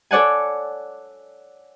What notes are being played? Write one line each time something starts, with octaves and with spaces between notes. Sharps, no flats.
A4 C#5 D5 F#5 G#5